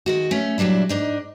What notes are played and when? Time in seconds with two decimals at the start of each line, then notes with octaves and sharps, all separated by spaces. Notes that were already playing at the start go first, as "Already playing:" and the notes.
0.06 D#3 G#3 F#4
0.31 A3 C#4
0.58 A#2 F#3 G3 D4 E4
0.89 G#2 D4 D#4